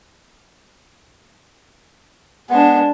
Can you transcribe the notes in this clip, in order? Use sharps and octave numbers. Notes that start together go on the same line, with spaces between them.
G#3 B3 D4